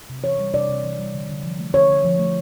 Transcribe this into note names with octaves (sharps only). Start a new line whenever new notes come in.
C3
E3 C#5
G3
C3 D5
C3
E3
G3
D3
D3
F3
A3
D3 C#5
D3
F3
A3